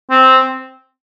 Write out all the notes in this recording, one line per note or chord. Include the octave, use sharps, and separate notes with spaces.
C4